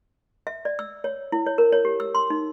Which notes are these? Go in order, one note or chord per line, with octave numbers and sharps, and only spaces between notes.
E5
D5
E6
C#5
E4
C#5
A#4
C#5
G4
E6
C6
D#4